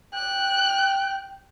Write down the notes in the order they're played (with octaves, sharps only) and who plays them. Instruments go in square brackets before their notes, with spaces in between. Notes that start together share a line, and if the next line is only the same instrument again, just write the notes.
[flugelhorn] G5 [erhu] F#6